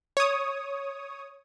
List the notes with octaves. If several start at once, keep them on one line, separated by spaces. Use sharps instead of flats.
C#5 D#6